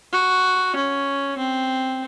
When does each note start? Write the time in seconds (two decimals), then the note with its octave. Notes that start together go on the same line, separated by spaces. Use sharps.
0.13 F#4
0.76 C#4
1.38 C4